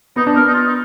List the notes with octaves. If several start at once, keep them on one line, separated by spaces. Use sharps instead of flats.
B3 D#4
D4
B3 A#4
D#4
F4
D#4